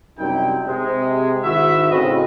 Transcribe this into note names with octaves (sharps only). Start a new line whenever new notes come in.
F#2 C3 G3 D#4 E4 G5
C3 G#3
G#2 D#3 E4 F#4 E5
A2 C#3 C4 F#4 B4 D#5